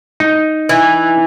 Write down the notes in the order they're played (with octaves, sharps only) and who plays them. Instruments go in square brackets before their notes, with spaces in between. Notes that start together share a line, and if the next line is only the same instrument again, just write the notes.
[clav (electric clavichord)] D#4
[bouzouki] E3